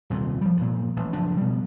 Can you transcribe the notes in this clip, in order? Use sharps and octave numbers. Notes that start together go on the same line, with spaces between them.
D#1 C2 A#2
F3 G3
G2 A#2
A1
F#1 F3 D4
B2 G3